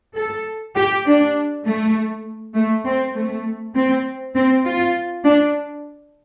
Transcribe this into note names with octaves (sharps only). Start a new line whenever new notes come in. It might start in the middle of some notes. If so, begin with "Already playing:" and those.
A4
G4
D4
A3
A3
C4
A3
C4
C4
F4
D4